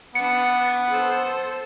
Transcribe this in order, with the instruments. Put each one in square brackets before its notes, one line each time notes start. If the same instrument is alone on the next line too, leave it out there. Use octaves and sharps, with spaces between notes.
[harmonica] B3 [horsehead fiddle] D4 B4 [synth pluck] C#7
[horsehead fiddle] A4 C5